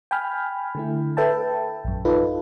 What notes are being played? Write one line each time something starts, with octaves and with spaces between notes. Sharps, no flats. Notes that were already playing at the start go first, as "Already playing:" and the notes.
G5 G#5 B5 F6
D3 A3 E4
A4 B4 E5 G5 A5
A#1 F#2
D#4 F4 A4 B4